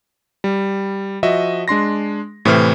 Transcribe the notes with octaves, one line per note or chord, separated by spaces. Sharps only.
G3
F3 F#4 D#5 E5
G#3 D4 C6 A#6
A2 C3 E3 B4 C5 F6